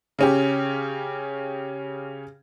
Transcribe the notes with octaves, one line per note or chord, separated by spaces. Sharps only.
C#3 C#4 G4